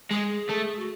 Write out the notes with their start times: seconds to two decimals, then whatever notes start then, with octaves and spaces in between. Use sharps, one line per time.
0.11 G#3 G#4
0.50 A3
0.79 F#4